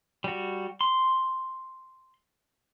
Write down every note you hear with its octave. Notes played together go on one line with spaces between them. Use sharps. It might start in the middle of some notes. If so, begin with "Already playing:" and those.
G3 F#4
C6